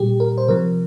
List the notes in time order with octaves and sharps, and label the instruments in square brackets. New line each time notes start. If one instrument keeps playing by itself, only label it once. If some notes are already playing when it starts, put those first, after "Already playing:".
Already playing: [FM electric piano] A#2 G3 G4
A#4
C5
C3 F3 A#4